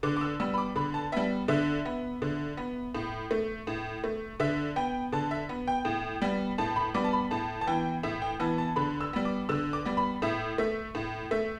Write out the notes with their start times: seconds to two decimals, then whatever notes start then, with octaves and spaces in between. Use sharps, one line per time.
0.03 D3 D6
0.17 D6
0.21 E6
0.40 G3 B3 E6
0.54 B5
0.58 D6
0.76 D3 B5
0.94 A5
1.12 G3 B3 E5
1.48 D3 E5
1.85 B3
2.22 D3
2.57 B3
2.95 A2
3.31 A3
3.67 A2
4.04 A3
4.40 D3 E5
4.76 B3 G5
5.13 D3 A5
5.31 E5
5.49 B3
5.67 G5
5.85 A2
6.22 G3 B3
6.58 A2 A5
6.76 B5
6.94 G3 B3 D6
7.04 A5
7.13 B5
7.31 A2 A5
7.61 A5
7.67 E3 B3 G5
8.03 A2 E5
8.22 G5
8.40 E3 B3 A5
8.58 A5
8.76 D3 B5
9.01 E6
9.13 G3 B3
9.25 D6
9.49 D3 E6
9.73 D6
9.85 G3 B3
9.97 B5
10.22 A2 E5
10.58 A3 E5
10.95 A2
11.31 A3 E5